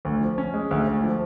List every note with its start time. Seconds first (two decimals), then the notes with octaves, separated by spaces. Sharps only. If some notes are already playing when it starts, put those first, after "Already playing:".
0.05 D2
0.21 F3
0.38 C#4
0.54 G#3
0.71 D2
0.87 D2
1.04 F3